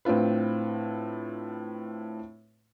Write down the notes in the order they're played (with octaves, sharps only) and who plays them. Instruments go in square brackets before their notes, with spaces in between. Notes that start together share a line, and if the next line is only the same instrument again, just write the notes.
[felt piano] A2 C4 D4 F4 B4